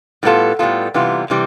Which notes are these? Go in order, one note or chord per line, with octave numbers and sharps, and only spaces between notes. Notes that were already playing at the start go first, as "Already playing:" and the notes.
A2 G3 B3 F4 A4
A2 G3 B3 F4 A4
C3 E3 G3 B3 F4
C3 E3 G3